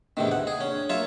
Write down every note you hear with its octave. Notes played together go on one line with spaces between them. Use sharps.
E2 A2 C3 D#3 D4
D#2 F#5
G#4
C#4 D4 C#5
F#3 A#3 F4 C#5 E5